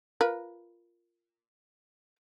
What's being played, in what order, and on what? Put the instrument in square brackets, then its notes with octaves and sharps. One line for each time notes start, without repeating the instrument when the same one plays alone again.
[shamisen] F4 A#4 B4